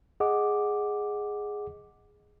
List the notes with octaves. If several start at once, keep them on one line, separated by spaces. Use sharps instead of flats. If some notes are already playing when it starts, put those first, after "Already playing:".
G#4 D#5 F#5 D6